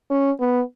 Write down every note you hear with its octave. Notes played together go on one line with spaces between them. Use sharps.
C#4
B3